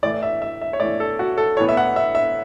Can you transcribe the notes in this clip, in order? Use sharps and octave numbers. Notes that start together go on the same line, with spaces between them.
A2 E3 A3 D5
E5
E5
E5
C#5
A2 E3 A3 D5
A4
F#4
A4
A2 E3 B3 C#5
E5
F#5
E5
E5